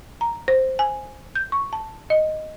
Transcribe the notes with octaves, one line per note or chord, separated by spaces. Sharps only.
A#5
C5
G#5
G6
C#6
A5
D#5